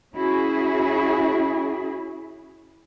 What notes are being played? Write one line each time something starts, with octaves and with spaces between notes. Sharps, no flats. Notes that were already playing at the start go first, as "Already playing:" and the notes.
C#4 E4 F#4 G#4